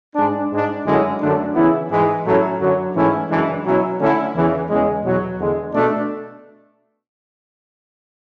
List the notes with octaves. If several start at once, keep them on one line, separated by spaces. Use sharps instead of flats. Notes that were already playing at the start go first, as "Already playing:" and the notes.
G#2 G#3 D4
G#2 G#3 D4
F#2 D3 G#3 C#4 E4
F#2 D3 A3 D4
C#3 E3 B3 E4
G#2 E3 G#3
A2 F#3 A3 C#4 E4
F#2 D3 F#3
G#2 E3 A3 C#4 E4
F#2 C#3 E3 G#3 D4
B2 F#3 C#4 E4
D3 A3 C#4 E4
E2 C#3 E3
E2 C#3 G#3
E2 B2 F#3
E2 D3 G#3
B2 A3 D4